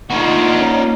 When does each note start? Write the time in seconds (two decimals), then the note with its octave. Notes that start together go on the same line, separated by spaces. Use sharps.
0.10 A#3 D4 D#4 F4 F#4 A#4 B4
0.59 C#4 C#5 A#5